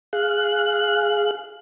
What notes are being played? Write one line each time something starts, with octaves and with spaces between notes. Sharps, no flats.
G#4 F5 F#6